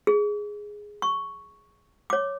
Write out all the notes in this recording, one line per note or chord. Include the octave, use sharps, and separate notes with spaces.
G#4
C#6
C#5 D6